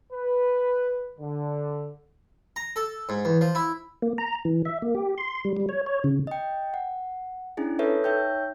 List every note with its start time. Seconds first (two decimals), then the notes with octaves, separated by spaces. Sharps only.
0.13 B4
1.19 D3
2.56 A#5
2.76 A4
3.09 G#2
3.25 E2
3.41 F3
3.55 E4
4.02 A#3
4.18 A#5
4.45 E3
4.65 E5
4.82 A#3
4.95 G4
5.18 C6
5.45 G3
5.57 G3
5.69 C#5
5.86 C#5
6.04 C#3
6.27 D#5 G5
6.74 F#5
7.57 C#4 D4 E4 G#4
7.79 A4 B4 C#5 E5
8.04 D#4 C#5 E5 G5 G6